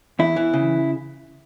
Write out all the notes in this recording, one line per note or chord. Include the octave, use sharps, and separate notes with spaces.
E2 E4
E3
C#3